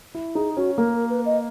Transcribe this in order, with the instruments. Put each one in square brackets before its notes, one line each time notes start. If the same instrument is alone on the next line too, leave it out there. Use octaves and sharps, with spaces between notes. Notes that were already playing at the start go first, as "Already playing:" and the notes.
[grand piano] E4
[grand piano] D#4 [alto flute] G#4
[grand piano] C#4 [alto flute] F#4
[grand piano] A#3 [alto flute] A#4
[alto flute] A#4
B4
D#5